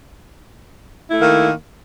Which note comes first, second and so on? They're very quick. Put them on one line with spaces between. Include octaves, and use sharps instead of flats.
E4 A3 D#3 A#3